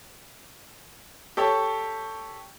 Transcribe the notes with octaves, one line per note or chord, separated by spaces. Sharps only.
G4 A4 C#5